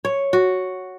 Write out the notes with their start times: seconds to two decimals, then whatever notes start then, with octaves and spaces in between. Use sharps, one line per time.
0.05 C#5
0.33 F#4